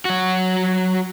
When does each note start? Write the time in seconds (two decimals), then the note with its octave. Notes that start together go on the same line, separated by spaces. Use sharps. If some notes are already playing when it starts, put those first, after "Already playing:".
0.05 F#3 F#4